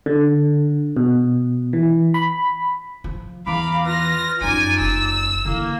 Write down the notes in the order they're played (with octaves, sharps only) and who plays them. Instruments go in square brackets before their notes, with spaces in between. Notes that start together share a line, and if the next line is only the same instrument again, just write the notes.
[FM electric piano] D3
B2
E3
B5
[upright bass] F3
[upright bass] E2 E3 [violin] F5 [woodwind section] A#5 B5 D6
[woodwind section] F4 B4 F6 [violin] A#6
[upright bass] F#2 F3 [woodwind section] D#4 F4 D5 [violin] G#5
[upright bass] F#1 [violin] E6
[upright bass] D3 E3 [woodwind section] A#3